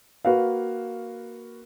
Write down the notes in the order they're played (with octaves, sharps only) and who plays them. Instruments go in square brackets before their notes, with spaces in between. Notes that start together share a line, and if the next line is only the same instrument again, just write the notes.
[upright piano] A#3 F#4 B4 F5